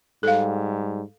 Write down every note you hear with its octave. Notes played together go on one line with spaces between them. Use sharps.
G#2 G3 A4 F5